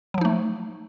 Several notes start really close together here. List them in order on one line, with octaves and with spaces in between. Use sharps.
F#3 F3 D#4 A3